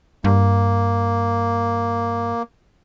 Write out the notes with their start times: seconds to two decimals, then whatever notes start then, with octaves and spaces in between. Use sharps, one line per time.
0.24 G2 A#3